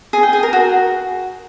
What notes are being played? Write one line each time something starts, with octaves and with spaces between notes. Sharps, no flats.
G#4
G5
G#4
A#4
F#4